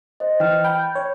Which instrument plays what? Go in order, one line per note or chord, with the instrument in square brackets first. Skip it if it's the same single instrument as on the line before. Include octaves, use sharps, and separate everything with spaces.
[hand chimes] C5 D#5
[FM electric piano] E3 [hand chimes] G5 F6 A6
[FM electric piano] G5 [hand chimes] B5 G6
[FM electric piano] C#5